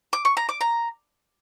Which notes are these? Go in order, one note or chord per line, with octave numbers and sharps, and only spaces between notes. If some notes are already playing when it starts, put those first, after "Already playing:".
D6
C#6
A#5
D6
A#5